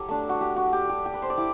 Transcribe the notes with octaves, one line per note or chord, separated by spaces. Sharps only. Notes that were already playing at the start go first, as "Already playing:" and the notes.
Already playing: F#3 G4 A4
A3 D4
F#4
G4
F#4
G4
G4
G4
B4
C5
D5
E4 G4